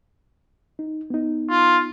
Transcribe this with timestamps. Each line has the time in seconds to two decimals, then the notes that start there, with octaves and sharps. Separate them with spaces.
0.79 D#4
1.10 B3 D#4
1.50 F4